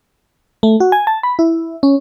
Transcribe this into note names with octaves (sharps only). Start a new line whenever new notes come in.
A3
F#4
G#5
A5
B5
E4
C#4